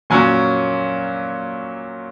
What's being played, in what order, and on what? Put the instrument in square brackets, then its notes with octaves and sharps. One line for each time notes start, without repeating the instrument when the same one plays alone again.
[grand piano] A#2 F#3 C#4 G#5